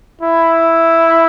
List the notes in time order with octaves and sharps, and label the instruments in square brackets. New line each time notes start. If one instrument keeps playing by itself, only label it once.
[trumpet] E4